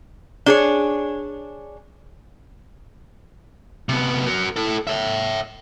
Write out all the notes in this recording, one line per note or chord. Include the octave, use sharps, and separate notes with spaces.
D4 G#4 C#5
C3 B3
F#4 A#4
E4 A4
C#5 E5